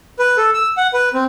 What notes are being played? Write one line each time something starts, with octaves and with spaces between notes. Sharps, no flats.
B4
A4
E6
F#5
B4
C4